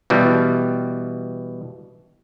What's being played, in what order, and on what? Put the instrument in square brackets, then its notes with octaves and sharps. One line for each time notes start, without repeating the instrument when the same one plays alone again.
[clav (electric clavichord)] B2 E3 G3